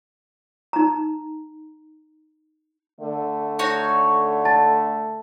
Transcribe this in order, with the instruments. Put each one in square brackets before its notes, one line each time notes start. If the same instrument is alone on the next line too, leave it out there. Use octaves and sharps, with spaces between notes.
[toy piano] D#4 A#5
[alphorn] D3 [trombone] A3
[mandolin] D#4 F#4 C#5
[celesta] A5 A6